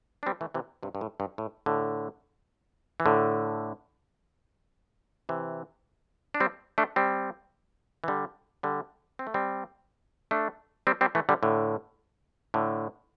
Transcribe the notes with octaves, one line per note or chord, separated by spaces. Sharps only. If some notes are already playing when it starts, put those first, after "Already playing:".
D4
G3 C4
E3 A3
C3 E3
G2 C3
G2
A2
G2
A2
A2 D3
E3
A2 D3
C3 E3
D4
G3 C4
A3 D4
G3 C4
E3
D3 G3
D3 G3
C4
A3
G3 C4
A3 D4
G3 C4
G3 C4
E3 A3
D3 G3
A2 D3
A2 D3